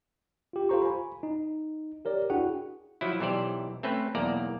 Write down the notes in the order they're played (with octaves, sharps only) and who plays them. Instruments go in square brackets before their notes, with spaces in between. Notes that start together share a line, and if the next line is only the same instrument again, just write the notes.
[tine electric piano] F4 G4
F4 G4 A4 C5 A#5 C#6
G#5 B5
D#4
G4 A#4 C#5 D5
D4 E4 F#4 G#4 F#5 G5
[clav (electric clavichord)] F3 F#3 E4
B1 E3 G4 C5 D5
A3 C4 C#4 B4
B1 E2 A#3 D5 A#5